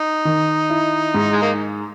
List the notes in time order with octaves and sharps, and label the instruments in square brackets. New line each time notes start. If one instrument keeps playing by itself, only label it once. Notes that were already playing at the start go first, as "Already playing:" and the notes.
Already playing: [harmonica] D#4
[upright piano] D#3
E4
G#2
[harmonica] G#3
A#3